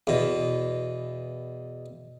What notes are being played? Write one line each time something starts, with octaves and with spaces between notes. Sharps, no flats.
E2 B2